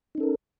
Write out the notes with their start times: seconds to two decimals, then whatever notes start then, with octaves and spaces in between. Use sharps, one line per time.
0.15 D#4
0.18 C#4
0.20 A4
0.23 A#4